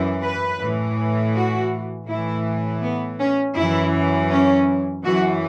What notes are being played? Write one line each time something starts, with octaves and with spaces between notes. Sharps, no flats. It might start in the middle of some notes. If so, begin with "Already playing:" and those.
Already playing: F#2 E3
B4
A2 E3
F#4
A2 E3 E4
B3
C#4
F#2 E3 E4
C#4
F#2 E3 F#4